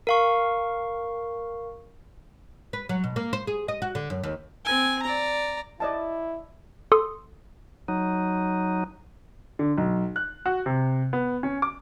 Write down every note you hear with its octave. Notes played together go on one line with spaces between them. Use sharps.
A#4 F5 C#6
B4
F#3
B2
A#3
C5
G#4
D#5
F#4
D3
F#2
D#2
C4 G#5
D5 A#5
E4 D5 D#5 A5
A4 C6 D#6
F#3 D#4
D3
B1
F#6
F#4
C3
B3
C#4
D6